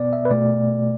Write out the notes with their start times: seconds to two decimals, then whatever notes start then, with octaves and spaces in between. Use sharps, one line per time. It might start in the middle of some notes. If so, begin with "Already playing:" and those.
Already playing: B2 B3 D5
0.13 E5
0.25 B4
0.30 B2 A3 D5